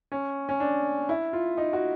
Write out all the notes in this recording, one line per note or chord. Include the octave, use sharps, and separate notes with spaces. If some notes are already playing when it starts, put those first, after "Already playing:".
C#4
C#4
D4
E4
F4
D#4
F#4